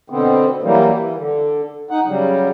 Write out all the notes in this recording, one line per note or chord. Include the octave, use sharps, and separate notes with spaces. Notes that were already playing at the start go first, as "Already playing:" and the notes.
B2 D3 B3 C4
E3 F#3 G3 A#3
E3
D3
D#4 F#5
C#3 F#3 G3